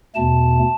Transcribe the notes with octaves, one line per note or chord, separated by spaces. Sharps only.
E2 B2 A3 A5